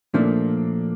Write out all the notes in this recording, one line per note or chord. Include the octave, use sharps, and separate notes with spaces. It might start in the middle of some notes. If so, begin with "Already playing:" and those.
A#2 F3 A3 A#3 D4